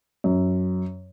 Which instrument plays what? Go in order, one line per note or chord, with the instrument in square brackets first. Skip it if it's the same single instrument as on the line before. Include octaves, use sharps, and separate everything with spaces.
[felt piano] F#2